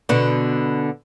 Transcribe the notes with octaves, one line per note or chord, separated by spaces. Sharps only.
B2 D3